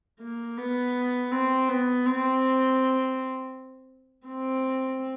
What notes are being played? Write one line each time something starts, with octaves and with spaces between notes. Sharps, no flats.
A#3
B3
C4
B3
C4
C4